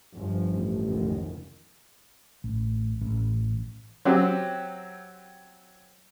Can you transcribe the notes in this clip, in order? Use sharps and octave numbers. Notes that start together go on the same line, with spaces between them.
G1 G2 F3
A1
F1 C#2 D#3
A1
A1
F#3 C4 G4